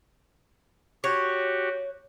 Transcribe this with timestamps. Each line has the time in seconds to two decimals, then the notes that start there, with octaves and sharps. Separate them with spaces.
1.04 F#4 G4 C#5